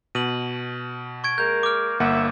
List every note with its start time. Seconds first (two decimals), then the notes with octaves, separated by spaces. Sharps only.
0.15 B2 D#7 F#7
1.24 C#6 G#6 D7
1.38 G#3 A#3 A#4 G6
1.63 D6 F6
2.00 G1 A#3 E5 F#5